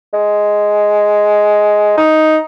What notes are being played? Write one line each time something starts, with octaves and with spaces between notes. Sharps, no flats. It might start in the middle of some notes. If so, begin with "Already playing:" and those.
G#3
D#4